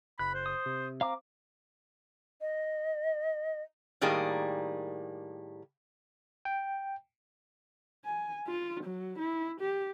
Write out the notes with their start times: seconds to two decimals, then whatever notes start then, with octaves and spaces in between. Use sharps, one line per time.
0.19 F#1 B5 F#6
0.35 C5
0.46 D#6
0.66 C3
1.01 C4 F5 A#5 D6
2.41 D#5
4.01 A2 D#3 G3 A#3 G#4
6.45 G5
8.05 G#5
8.48 F4
8.84 F#3
9.19 E4
9.61 G4